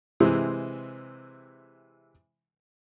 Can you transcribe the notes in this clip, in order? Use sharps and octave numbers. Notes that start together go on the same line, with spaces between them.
C3 E3 G#3 C4